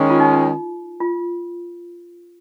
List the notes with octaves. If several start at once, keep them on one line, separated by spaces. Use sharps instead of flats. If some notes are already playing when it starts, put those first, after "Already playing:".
Already playing: D#3 G#3 C#4
F4
D#4
F4